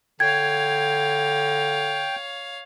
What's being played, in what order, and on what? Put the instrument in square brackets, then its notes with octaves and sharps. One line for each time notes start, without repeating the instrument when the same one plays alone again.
[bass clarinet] D3 [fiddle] C#5 F5 [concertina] G5 [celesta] G#6